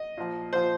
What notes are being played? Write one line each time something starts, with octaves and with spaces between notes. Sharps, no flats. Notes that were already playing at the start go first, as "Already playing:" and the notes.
Already playing: D#5
A#2 F3
A#2 F3 C5